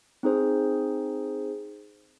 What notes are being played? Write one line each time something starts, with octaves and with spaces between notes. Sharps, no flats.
C4 D#4 G#4 C5